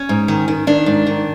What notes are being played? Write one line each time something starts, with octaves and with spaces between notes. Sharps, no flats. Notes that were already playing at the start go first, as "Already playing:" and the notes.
Already playing: C#4
G#2
D#3
D#3
D#3 D4
G#2
D#3